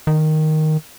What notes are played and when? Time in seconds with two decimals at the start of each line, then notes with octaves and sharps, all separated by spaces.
0.07 D#3